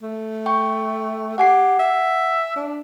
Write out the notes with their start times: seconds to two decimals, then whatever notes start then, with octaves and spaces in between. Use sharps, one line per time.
0.03 A3
0.46 G5 C#6
1.38 G4 F#5 G#5 C7
1.79 E5
2.56 D4